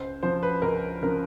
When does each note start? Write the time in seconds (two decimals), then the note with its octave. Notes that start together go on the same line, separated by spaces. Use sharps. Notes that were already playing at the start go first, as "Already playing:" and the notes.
Already playing: C#2 C5
0.23 C#3 F3 C5
0.43 B4
0.62 C#2 A#4
1.02 C#3 F3 A#4